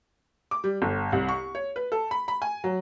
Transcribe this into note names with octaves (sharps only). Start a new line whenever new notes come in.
D6
G3
G1
C2
C#6
C#5
B4
A4
B5
B5
G#5
F#3